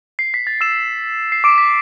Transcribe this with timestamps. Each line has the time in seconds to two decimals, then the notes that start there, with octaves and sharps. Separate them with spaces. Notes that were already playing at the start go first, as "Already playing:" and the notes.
0.19 C7
0.34 B6
0.47 A6
0.61 E6 E7
1.32 C7
1.44 D6 D7
1.58 B6